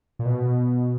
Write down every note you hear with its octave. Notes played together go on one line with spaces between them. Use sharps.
A#2
B2